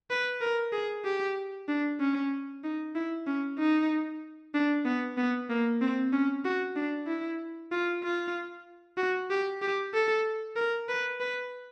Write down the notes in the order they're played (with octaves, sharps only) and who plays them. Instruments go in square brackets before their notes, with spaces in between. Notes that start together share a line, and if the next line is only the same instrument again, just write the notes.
[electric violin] B4
A#4
G#4
G4
D4
C#4
D#4
E4
C#4
D#4
D4
B3
B3
A#3
C4
C#4
F#4
D4
E4
F4
F4
F#4
G4
G4
A4
A#4
B4
B4